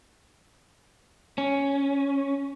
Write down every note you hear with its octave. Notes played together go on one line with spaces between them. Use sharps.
C#4